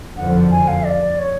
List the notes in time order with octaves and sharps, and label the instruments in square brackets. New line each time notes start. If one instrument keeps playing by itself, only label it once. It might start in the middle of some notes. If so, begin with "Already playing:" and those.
[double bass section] F#1 F2 D3 F3 [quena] F#5
[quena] G#5
F5
D5
C#5